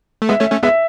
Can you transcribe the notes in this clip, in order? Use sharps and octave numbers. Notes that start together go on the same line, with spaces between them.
A3
G#3 B3 E5
A3 C#4
A3 C#4
G#3 B3 E5